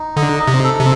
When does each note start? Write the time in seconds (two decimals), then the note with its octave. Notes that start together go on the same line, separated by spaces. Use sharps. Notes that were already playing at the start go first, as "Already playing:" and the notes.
Already playing: D#4
0.17 D3 D#5
0.40 D#4
0.47 C3
0.64 A4
0.80 C3